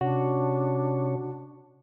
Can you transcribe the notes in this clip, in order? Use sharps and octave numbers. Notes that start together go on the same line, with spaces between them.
C3 C#4 D4 F#4 C#5